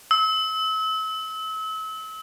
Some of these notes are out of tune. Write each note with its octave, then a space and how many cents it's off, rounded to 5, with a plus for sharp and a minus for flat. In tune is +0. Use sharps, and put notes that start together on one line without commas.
E6 -35